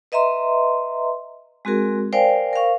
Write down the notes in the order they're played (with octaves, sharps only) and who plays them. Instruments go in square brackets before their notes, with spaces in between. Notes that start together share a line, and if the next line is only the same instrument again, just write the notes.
[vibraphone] B4 D#5 E5 A#5 C6
G#3 C4 F#4 G#4 A#4
A#4 C5 D5 F5 G5 G#5
A#4 C5 F5 C#6